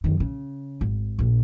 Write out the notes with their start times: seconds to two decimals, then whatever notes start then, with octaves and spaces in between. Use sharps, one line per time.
0.04 F#2 D#3
0.20 C#3
0.81 G#1
1.19 A#1 A#2